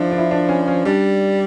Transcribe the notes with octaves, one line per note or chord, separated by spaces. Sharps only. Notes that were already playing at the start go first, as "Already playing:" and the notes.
Already playing: F3 D4 E4
D4
E4
D4
C#4
C#4
G3 D4